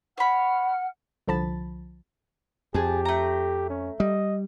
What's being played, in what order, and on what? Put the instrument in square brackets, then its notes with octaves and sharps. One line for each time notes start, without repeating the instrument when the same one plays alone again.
[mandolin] C#5 B5 [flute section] F#5 F6
[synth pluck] C2 D3 F3 A5 B5 A6
[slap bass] F2 [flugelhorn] G4 [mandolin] G#4 A5
[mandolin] A3 A#5
[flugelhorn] C#4
[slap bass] G3 [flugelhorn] D#5